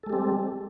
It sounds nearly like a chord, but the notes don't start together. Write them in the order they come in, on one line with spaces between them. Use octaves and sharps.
A4 G#3 G4 C4 G3